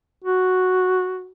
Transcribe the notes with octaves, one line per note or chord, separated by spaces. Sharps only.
F#4